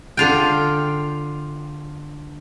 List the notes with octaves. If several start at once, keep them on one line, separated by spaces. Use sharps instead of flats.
D3 F4 G5